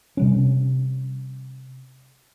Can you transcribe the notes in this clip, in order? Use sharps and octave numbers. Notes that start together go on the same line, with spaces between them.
C3 G3 C#4